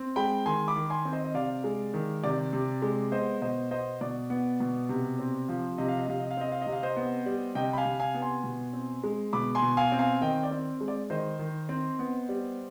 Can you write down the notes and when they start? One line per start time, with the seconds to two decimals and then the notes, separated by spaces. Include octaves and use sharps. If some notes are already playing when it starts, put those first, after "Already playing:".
Already playing: C4
0.16 G#3 G5 B5
0.46 D#3 G#5 C6
0.68 B5 D6
0.76 D#3
0.90 G#5 C6
1.05 C4
1.13 C5 D#5
1.24 D#5
1.34 C3 D5 F5
1.64 G#3
1.94 D#3
2.24 C3 D5
2.53 C3
2.82 G#3
3.12 B3 C5 D#5
3.42 B2 C5 D#5
3.71 B3 C5 D#5
4.01 B2 D5
4.30 B3
4.60 B2
4.89 C3
5.19 C4
5.49 F3
5.78 C3 D#5
5.88 F5
5.99 D#5
6.08 C3 F5
6.20 D#5
6.31 F5
6.37 C4 D#5
6.52 F5
6.62 C3 D#5
6.72 F5
6.83 C5 D#5
6.96 B3
7.26 G3
7.55 C3 D#5 G5
7.73 B5
7.78 F5 G#5
7.85 C3
8.00 F5 G#5
8.14 B3
8.22 G#5 C6
8.44 B2
8.73 C4
9.04 G#3
9.33 B2 B5 D6
9.55 G#5 C6
9.62 B2
9.77 F5 G#5
9.92 C4
9.99 F5 G#5
10.21 D#3 D#5 G5
10.43 D5
10.51 C4
10.81 G#3
10.88 D5
11.10 D#3 C5 D#5
11.39 D#3
11.69 C4
11.99 B3
12.29 G3